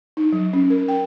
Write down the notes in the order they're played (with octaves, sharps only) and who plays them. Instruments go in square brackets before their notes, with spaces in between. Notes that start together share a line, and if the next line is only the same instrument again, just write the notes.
[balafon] D#4
F#3
C#4
A#4
G5